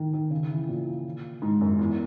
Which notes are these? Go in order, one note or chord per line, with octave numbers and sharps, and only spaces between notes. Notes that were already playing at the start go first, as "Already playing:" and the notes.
Already playing: D#3
D#3
C#3
E3
A#2
G#2
F#2
E2